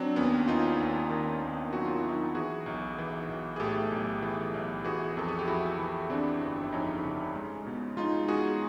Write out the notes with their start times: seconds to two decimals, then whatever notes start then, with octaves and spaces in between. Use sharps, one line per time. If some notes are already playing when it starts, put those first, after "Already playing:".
Already playing: F#3 C4 D4
0.16 D#2 B3 C#4
0.48 D#2 D#4 F4
0.79 D#2
1.10 D#3
1.41 D#2
1.73 F#3 F#4
1.85 F4
1.98 E4
2.04 F#3
2.09 D#4 F4
2.35 E3 F#4 G#4
2.66 B1
2.98 E3
3.28 B1
3.56 G#4
3.60 A2 G4 A4
3.91 B1
4.22 E3
4.54 B1
4.85 E3 F#4 G#4
5.17 F2 A4
5.28 G#4
5.39 G4
5.47 F2 E4 F#4
5.78 E3
6.10 E3 C4 D4
6.41 G1
6.64 E4
6.72 F2 C#4 D#4
7.04 C#3
7.36 G#3
7.67 B2
7.97 G#3 D#4 F4
8.28 G#3 F#4 G#4